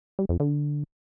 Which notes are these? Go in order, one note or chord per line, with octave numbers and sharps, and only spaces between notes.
G3
F2
D3